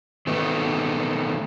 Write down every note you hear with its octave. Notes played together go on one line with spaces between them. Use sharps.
D#3 A3 B3